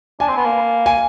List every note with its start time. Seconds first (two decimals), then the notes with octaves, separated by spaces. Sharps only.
0.20 D4 G#5
0.28 C4
0.37 B3
0.45 A#3
0.86 G#5